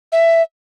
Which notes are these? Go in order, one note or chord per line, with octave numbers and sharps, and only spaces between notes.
E5